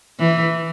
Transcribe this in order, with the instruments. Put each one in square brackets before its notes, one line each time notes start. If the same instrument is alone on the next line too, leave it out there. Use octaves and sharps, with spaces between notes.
[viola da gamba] E3